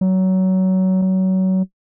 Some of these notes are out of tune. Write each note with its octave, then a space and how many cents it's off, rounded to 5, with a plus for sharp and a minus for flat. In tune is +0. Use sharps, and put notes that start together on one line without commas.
F#3 +20
F#3 +25